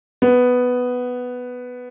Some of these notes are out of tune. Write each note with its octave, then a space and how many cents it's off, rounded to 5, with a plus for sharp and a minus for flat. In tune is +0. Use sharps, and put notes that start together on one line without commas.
B3 +5